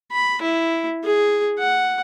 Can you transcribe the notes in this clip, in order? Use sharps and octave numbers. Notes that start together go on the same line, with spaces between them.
B5
E4
G#4
F#5